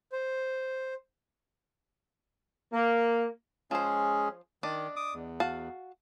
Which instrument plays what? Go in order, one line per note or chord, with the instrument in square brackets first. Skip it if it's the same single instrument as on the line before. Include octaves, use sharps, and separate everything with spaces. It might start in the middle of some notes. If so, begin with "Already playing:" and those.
[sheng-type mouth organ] C5
[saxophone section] A#3
[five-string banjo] F3 C5 [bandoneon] G#3 C#4 G#4
[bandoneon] D#3 [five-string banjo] D4 D5 D#5
[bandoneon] D6 D#6
E2
[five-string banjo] F#4 F5 A5